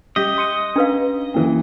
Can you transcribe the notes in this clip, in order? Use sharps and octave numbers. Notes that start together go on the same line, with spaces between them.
G3 G4 D#5 G6 B6
C6 C#7 D#7
C#4 D4 B4 F5
F#2 E3 A#3